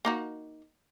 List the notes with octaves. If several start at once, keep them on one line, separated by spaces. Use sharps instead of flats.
A#3 D#4 F#4